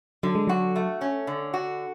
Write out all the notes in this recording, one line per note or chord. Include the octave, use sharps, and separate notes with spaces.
D3 F#3
G#3
F#3 F#4
A3
C#4
D3
F#4